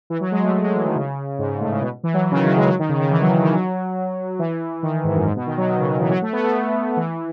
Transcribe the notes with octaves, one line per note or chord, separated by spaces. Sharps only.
E3
F#3
G#3
A3
G#3
G#3
E3
D#3
C#3
G#2
G#2
A2
C#3
B2
E3
F#3
E3
C#3
D#3
F#3
G#3
F#3
D#3
C#3
D#3
E3
F#3
F#3
D#3
F#3
E3
D#3
G#2
F#2
G#2
B2
D#3
F#3
D#3
C#3
D#3
E3
F#3
A3
B3
A3
E3